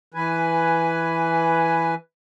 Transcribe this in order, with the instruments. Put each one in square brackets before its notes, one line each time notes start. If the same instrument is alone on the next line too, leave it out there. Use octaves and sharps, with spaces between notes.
[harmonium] E3 B4 G#5